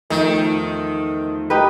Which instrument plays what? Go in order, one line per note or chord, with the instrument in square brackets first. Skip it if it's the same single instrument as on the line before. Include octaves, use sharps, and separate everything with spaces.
[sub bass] E2 [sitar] D#3 [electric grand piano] F3 A3
[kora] D#4 G4 B4